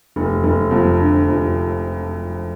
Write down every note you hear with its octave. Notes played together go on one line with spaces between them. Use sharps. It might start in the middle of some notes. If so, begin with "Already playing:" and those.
F1
F1
F2
D3
F1